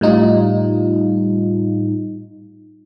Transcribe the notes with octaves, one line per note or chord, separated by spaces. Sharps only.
A2 G3 D#4 F4